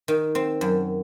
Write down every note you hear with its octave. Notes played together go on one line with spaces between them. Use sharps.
D#3
C4
F#2